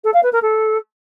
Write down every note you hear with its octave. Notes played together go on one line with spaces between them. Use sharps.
A4
F5
B4
A#4
A4